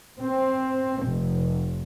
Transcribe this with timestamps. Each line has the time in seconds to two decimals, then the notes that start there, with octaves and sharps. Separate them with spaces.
0.22 C4
1.04 F1